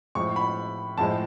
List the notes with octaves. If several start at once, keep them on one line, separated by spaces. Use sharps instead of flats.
A2 F3 G#3 C#6
B5
A2 F3 G#3 A5